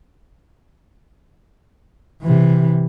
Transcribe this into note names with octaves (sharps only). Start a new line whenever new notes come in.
C3 E3